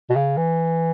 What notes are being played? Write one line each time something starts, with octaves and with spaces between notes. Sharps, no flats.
B2
C#3
E3